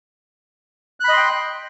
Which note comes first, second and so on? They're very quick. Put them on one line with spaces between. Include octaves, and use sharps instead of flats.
F#6 B5 D#5 C6 G5